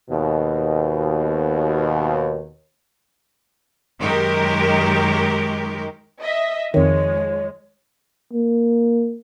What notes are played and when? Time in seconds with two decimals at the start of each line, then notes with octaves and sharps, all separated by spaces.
0.10 D#2 B2
4.00 F#2 D#3 G#3 G4 A#4
6.22 D#5 E5
6.74 F2 D#3 F3 G#3 C#5
8.33 A#3